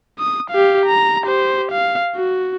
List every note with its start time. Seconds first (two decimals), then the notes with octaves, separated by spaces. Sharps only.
0.19 D#6
0.51 G4 F5
0.86 A#5
1.23 G4 C5
1.72 F5
2.16 F#4